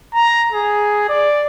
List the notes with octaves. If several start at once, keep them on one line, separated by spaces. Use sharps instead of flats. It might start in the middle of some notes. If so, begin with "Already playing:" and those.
A#5
G#4
D5